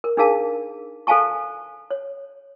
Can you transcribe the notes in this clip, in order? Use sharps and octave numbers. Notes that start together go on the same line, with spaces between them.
A#4
D4 D#4 G#4 A#4 F5 A5
A4 C5 F5 G#5 A5 C#6
C#5